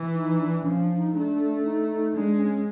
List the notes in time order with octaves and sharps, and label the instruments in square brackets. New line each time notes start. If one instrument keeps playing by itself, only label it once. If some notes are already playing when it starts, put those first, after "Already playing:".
Already playing: [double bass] E3
[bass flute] D#4
D4
[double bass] F3 [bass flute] C#4
[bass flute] D4
D#4
[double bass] A3 [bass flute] D4
[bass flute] D#4
D#4
[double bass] G#3 [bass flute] D4
[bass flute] C#4